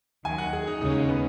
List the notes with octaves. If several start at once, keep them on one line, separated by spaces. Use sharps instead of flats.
D#2 D#3 F#3 G#5
F#5
G#4
D#4
D#2 C#3 G#3 C#4 D#4
B3